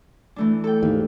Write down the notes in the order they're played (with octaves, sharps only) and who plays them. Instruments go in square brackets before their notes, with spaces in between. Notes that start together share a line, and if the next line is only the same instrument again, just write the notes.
[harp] E3 A3 D4
A4 G5
[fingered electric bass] D#2 G#2